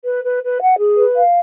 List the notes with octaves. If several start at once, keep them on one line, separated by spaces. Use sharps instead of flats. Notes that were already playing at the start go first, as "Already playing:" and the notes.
B4
B4
B4
F#5
G#4
B4
F5